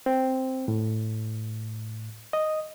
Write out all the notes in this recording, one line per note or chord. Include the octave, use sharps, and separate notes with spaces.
C4
A2
D#5